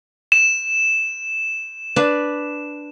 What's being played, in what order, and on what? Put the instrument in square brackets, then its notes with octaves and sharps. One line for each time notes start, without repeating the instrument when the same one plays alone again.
[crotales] E7
[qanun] D4 B4